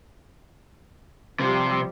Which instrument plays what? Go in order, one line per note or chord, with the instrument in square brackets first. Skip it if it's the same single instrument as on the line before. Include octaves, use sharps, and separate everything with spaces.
[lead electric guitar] C3 [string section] F3 G3 G4 [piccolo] C6